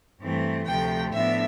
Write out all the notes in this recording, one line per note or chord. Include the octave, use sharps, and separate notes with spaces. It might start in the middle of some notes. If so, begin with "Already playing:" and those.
G2 E3 A3 C4
D2 C3 F3 A3 G5
A2 F3 B3 D4 E5